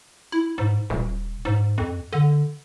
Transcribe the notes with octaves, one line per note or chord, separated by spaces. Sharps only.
E4
G#2
D#1
G#2
F2
D3